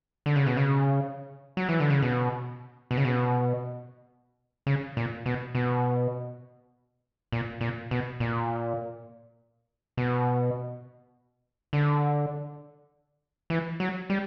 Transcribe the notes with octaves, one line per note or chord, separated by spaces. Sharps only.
D3
C#3
B2
C#3
F#3
E3
D3
C#3
B2
B2
C#3
B2
C#3
A#2
B2
B2
A#2
A#2
B2
A#2
B2
D3
E3
F#3
G3